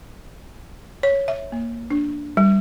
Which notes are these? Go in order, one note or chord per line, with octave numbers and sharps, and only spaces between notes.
C#5
E5
A#3
D4
G3